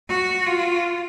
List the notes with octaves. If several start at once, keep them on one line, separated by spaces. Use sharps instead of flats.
F#4
F4